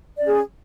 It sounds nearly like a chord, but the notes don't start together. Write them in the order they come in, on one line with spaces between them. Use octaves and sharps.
D5 C#4 G#4